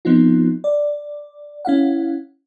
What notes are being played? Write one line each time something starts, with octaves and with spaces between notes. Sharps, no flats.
F3 B3 C4 D#4 F4
D5
C#4 E4 F5 F#5